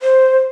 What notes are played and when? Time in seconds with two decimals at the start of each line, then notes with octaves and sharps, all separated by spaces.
0.01 C5